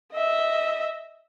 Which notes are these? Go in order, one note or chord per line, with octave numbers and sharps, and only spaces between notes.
D#5 E5